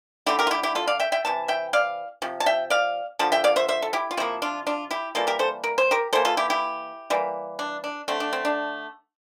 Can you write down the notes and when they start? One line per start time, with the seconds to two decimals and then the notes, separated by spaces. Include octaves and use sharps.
0.26 D3 A3 E4 G4
0.39 G4 A#4
0.47 F4
0.51 E4 G4
0.63 E4 G4
0.75 F4 A4
0.87 D5 F5
1.00 E5 G5
1.12 E5 G5
1.25 C3 E3 A5
1.48 E5 G5
1.73 D5 F5
2.22 C3 F3
2.40 A5
2.46 E5 G5
2.70 D5 F5
3.19 D3 F3 A5
3.32 E5 G5
3.44 D5 F5
3.56 C5 E5
3.68 C5 E5
3.82 A4
3.93 E4 G4
4.11 F4
4.17 C3 F3 A#3 C4 E4
4.42 D4 F4
4.67 D4 F4
4.91 E4 G4
5.15 E3 G3 A#3 F4 A4
5.27 G4 A#4
5.39 A4 C5
5.64 A#4
5.78 C5
5.91 G4 A#4
6.13 E3 A#3 A4 C5
6.25 F4 A4
6.37 E4 G4
6.50 E4 G4
7.10 E3 G3 A#3
7.59 D4
7.84 D4
8.08 D3 A3 C4
8.20 D4
8.33 C4
8.45 D4